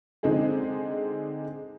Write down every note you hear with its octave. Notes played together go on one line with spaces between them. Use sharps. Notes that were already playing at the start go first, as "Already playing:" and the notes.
D3 G#3 C4 D#4 G#4